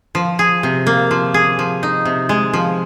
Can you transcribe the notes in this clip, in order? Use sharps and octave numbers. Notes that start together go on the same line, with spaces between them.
F3
G#4
C3
A#3
F3
G#4
F3
D#4
C3
G#3
F3